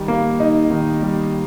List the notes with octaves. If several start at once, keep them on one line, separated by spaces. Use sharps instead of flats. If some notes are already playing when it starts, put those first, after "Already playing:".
Already playing: D#3 G3
A#3
D#4
D#3
G3